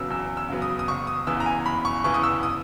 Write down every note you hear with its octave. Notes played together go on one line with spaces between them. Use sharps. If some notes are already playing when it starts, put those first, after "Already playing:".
Already playing: E2 C#3 F#3 B3 E6
E2 E6
E6
C#3 F#3 B3
D#6
D#6
F#1 C#6
D#6
E2 C#3 E3 B3 E6
A#5
G#5
F#1 B5
C#6
E2 C#3 E3 B3 C#6
D#6
E6
D#6